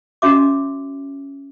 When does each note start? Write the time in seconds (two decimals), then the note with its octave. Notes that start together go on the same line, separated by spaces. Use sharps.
0.22 C#4 F#4 E5 D6